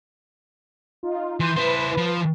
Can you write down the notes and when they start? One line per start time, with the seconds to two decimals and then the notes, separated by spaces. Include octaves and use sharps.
1.03 D#4 F4
1.40 E3 C6 G6 D#7
1.57 E4 B4 C5
1.97 F3